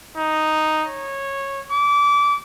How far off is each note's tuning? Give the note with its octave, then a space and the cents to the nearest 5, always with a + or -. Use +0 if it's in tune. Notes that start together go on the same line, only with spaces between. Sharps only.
D#4 +0
C#5 -15
D6 -25